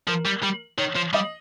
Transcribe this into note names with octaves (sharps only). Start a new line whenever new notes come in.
F3 A#4
G3
G3
D#3 C#5
F3
G3 D#5